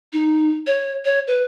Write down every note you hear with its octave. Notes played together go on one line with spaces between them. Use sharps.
D#4
C#5
C#5
B4